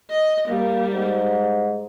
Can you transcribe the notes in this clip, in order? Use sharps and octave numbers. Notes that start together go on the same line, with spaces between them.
D#5
G3 A#3
G#2